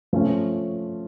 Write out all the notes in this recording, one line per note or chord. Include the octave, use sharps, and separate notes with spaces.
F3 A3 C#4